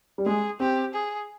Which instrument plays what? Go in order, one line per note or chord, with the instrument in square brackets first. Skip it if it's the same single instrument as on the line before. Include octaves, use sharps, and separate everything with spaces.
[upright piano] G3
[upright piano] G#3 [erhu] G#4
[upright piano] C4 [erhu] G4
[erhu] G#4